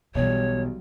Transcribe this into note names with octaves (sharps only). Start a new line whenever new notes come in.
B1 B2 E3 F#3 G3 C#5